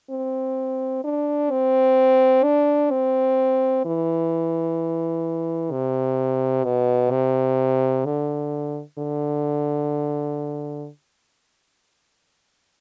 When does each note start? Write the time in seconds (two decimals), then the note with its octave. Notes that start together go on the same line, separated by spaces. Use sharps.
0.10 C4
1.04 D4
1.51 C4
2.43 D4
2.91 C4
3.85 E3
5.71 C3
6.65 B2
7.11 C3
8.05 D3
8.98 D3